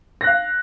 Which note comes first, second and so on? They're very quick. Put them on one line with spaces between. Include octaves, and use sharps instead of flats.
A#6 F#6 F5